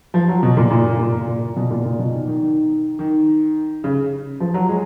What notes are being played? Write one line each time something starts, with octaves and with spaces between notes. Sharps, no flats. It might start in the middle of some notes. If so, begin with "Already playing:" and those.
F3
F#3
B2
A#2
A#2
A#2
A#2
B2
A#2
A#2
B2
D#3
D#3
D#3
D#3
C#3
F3
F#3
G#3